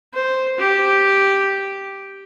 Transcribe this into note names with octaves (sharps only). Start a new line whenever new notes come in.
C5
G4